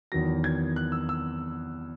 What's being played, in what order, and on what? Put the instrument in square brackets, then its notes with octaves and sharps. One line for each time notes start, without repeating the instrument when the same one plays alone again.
[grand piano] E2 D#3 F#3 A#6
G#6
F#6
E6
E6